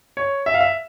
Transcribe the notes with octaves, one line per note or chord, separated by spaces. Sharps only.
C#5
E5
F5
E5